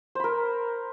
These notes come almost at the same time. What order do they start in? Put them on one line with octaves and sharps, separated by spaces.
C5 B5 A#4